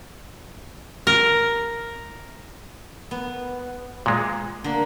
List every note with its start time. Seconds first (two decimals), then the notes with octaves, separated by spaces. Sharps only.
1.07 A#4
3.11 B3
4.06 A#2 G#3
4.64 D3 A#3